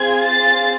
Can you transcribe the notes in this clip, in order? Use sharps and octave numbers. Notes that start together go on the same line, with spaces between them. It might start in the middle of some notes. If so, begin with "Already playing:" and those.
Already playing: C4 F4 G#4 G#6
A6